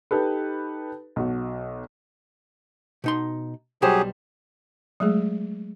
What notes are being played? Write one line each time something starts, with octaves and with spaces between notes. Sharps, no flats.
D#4 G4 A4 B4
B1 F#4
B2 D#4 C6
B1 F#3 G3 G4 G#4 C5
F#3 G#3 A3 G#4